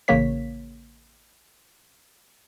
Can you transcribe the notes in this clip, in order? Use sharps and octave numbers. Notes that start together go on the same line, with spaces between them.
A1 C#3 A#3 C#5 B6